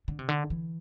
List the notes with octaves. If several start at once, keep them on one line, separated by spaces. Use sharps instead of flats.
D3
C3
D3
E3